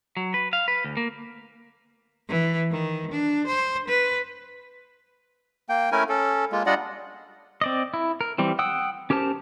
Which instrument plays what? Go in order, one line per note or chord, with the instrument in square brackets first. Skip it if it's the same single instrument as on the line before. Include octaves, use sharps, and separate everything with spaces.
[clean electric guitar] F#3
B4
F5
B4
D2
A#3
[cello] E3
D#3
D4
C5
B4
[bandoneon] A#3 G5
A3 C#4 E4 A#4 G#5
C#4 A4
G#3 A#3 F4
G3 D4 F4 D5 D#5 F#5
[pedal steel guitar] C4 D5 D#5
E4
A#4
E3 G3 C4
F#5 G5 D#6 E6
C#4 G4 A#4 C5 A5